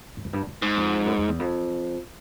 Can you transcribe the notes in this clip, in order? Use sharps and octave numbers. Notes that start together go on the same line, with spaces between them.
G2
F#2
G2
F#2
G#2
F2
F#2
F2
E2
F2